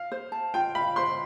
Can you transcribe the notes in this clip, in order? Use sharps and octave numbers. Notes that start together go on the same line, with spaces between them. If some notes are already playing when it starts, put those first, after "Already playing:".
Already playing: F5
C5
A5
F4 G5
F5 B5
C5 C6